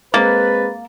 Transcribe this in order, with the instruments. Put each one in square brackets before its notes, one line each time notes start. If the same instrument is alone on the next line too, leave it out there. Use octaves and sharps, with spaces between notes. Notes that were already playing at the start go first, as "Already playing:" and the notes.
[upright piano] G#3 C4 [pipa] A#3 [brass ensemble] B4 [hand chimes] A6